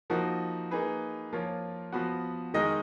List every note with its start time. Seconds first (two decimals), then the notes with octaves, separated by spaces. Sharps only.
0.10 F3 A#3 D#4 F#4
0.71 A#3 D#4 G#4 B4
1.33 F3 A#3 F4 A#4 C#5
1.93 F3 B3 F#4
2.54 D#3 G#3 D#4 A#4 D#5